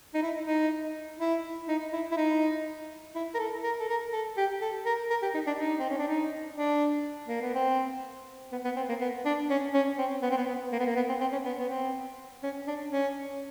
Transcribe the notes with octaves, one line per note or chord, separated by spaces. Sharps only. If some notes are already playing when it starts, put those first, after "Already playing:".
D#4
E4
D#4
E4
D#4
E4
E4
D#4
E4
A#4
A4
A#4
A4
A#4
A4
G4
A4
A#4
A#4
G4
D#4
D4
D#4
C4
C#4
D4
D#4
D4
A#3
B3
C4
B3
B3
C4
A#3
B3
D4
C#4
C#4
C4
B3
C4
B3
B3
A#3
B3
A#3
B3
C4
C4
C#4
B3
B3
C4
C#4
D4
C#4